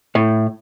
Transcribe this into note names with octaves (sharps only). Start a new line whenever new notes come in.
A2